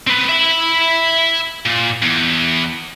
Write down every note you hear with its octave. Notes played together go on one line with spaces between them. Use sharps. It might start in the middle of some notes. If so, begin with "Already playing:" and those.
C4 B4
E5 B5
A#2
E2